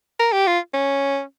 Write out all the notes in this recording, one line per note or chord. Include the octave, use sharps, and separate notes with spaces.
A#4
G4
F4
C#4